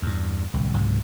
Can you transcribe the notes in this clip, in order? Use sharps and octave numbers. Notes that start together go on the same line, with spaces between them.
E2 G2
D1 C2
C#2 G#2 C3 F#3